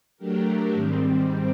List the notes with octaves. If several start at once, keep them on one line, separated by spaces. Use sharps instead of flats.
F#3 A3 D4 G4 A#4
G#2 D#3 G3 C4